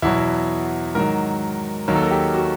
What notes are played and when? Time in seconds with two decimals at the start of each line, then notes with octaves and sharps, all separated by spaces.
0.02 E2 B2 F#3 E4
0.95 G#2 D#3 F#3 A#4
1.88 D#2 D#3 F#3 A#4
1.96 A4
2.02 A#4
2.11 G4
2.34 F#4